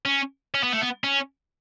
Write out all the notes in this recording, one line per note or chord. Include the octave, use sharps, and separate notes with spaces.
C#4
C#4
B3
A3
B3
C#4